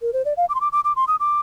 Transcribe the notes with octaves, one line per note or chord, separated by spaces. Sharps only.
A#4
C5
D5
F5
D6
C6
D6
D6
D6
C6
D#6
D6